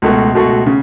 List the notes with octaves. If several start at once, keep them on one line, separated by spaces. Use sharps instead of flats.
C#2 B2 A3 F#4
C#2 B2 A3 F#4
C#3